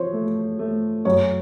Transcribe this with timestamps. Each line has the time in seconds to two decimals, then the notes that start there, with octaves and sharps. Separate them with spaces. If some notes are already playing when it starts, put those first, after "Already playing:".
Already playing: F3 C5 C#5
0.13 A3
0.59 A3
1.05 F#2 C#5